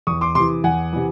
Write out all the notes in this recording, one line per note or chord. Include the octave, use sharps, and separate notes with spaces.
E2 C#6 D#6
C6 D6
C3 E3 C6 D6
E2 F#5 G#5
C3 E3